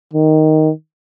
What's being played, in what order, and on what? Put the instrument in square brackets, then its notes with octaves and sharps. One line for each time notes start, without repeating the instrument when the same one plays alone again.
[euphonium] D#3